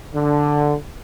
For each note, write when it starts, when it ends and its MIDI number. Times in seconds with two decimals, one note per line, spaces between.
0.13 0.74 50